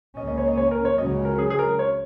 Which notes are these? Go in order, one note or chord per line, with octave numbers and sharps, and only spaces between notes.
C#2 C#3 A#3 C#4 D#5
D#5
C#5
D#5
C#5
A#4
C#5
C#2 C#3 F#3 C#4 D#5
A#4
G#4
G#4
A#4
C#5